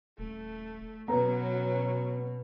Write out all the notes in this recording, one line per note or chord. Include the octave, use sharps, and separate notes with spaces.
D#1 A3
B2 F#3 B3 C#4 B4 A#5